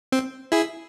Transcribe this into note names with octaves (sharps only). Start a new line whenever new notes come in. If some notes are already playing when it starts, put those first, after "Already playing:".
C4
E4 G#4